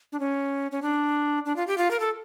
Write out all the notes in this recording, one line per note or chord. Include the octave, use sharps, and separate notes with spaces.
D4
C#4
C#4
D4
D4
F4
G4
F4
A#4
A4